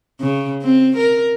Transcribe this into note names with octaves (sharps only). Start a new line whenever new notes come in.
C#3
C4
A#4